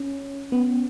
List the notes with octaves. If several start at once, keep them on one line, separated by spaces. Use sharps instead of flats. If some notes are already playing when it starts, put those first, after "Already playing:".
Already playing: C#4
B3